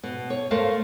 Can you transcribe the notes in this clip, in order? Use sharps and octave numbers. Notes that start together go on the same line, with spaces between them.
B2
C#5
A3 A#4 C5 F5